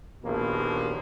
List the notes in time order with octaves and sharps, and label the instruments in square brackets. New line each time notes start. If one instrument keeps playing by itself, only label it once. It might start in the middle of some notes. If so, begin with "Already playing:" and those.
[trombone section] A#1 D#2 B2 A#3